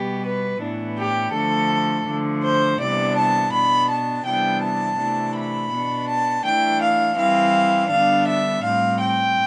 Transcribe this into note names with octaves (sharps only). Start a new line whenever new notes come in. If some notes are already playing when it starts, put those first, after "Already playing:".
Already playing: B2 G3 B3 G4
B4
A2 E3 B3 D4
G4
D3 F3 A3 A4
D3 F3 A3
C5
C3 E3 G3 B3 D4 D5
A5
B2 B3 D4 B5
A5
C3 E3 G3 B3 D4 G5
A5
C3 E3 A3 D4
B5
B2 B3 D4
A5
E3 A3 D4 G5
F5
E3 G3 C4 F5
D3 G3 B3 D4 F5
E5
A2 G3 C4 F5
G5